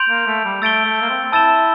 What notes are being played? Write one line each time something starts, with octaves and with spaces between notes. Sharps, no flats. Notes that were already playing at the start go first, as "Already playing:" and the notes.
Already playing: C6 G6 D7 F7
A#3
A3
G3
A3 E6 A6 D7 G7
A3
A#3
C4
E4 A5 E6 A6 E7 G7